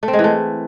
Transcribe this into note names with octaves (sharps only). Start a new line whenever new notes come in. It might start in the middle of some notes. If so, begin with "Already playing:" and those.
A3
C4
G#3
E3
A3